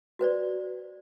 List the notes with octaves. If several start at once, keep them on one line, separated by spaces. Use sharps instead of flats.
F#4 B4 C5 D5